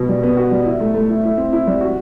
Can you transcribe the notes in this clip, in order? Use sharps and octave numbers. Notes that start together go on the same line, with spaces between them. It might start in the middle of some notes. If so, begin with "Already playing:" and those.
Already playing: B2
G3
B3
F#4
G3
E4
A3
A3
E4
E4
C4
E4
G3
F#4